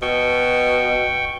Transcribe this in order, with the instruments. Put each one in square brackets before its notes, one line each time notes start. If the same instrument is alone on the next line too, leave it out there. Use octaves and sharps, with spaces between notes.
[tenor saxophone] B2 [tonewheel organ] G5 C#6 G6